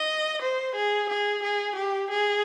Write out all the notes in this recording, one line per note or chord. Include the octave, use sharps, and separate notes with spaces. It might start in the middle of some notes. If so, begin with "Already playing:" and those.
Already playing: D#5
C5
G#4
G#4
G#4
G4
G#4